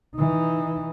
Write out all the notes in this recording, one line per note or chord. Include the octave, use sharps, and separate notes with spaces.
E3 D#4